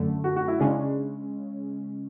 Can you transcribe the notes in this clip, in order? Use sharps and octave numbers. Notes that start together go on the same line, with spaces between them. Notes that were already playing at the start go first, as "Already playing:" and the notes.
Already playing: F#2 D3 A3
F#4
F#4
E4
C#3 G#3 C#4 D4